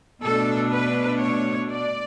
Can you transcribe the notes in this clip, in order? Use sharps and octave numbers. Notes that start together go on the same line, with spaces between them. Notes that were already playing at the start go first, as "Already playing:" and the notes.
B2 A3 D4 A4
B4
C#5
D5